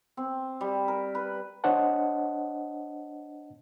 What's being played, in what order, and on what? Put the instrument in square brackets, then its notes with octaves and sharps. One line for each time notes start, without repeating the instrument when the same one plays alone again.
[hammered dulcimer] C4
G3
A#4
B4
[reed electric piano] D4 C5 C#5 D#5 F#5 A5